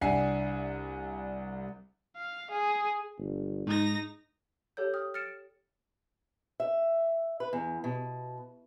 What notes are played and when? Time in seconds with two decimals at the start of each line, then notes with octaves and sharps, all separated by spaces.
0.01 C2 D4 E5 F#5 G#5 C7
2.17 F5
2.51 G#4
3.18 G1
3.66 G#2 D#4 A#6
4.77 G4 A4 C#5 G6
4.94 G5 D#6 F6
5.14 F6 A6 C#7 D7 E7
6.60 E5
7.40 B4
7.53 E2
7.84 B2